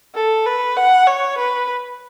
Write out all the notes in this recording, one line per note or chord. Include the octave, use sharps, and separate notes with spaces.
A4
B4
F#5
C#5
B4